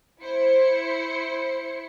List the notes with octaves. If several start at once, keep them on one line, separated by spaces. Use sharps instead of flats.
E4 C5 C#7